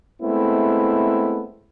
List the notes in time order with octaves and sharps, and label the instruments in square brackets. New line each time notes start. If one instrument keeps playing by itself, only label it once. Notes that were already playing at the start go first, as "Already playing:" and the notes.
[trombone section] G#3 A3 B3 C4 E4